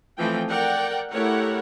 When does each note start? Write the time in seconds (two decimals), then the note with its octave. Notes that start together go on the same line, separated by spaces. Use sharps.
0.17 E3 F3 A3 C4 G5
0.48 A#4 D5 F#5 G5
1.10 A3 E4 G4 A#4 C#5 F#5